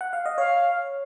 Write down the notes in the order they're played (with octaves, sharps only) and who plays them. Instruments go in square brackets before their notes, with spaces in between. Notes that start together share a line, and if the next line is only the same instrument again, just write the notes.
[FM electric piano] F#5
F5
D#5
[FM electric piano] C#5 [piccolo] F5